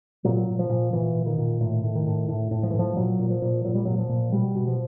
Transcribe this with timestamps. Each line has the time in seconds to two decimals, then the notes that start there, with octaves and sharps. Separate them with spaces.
0.24 A#2 F#3
0.47 A#2
0.59 F3
0.70 A#2
0.93 A#2 E3
1.15 A#2
1.26 D#3
1.38 A#2
1.60 A2 D#3
1.83 A2
1.95 D#3
2.07 A2
2.28 A2
2.51 A2
2.63 F3
2.71 E3
2.74 A2
2.79 F3
2.96 A#2 F#3
3.19 A#2
3.30 F3
3.42 A#2
3.65 A#2 F#3
3.75 G3
3.85 A#2 F#3
3.99 F3
4.09 A#2
4.32 B2 G3
4.55 B2
4.67 F3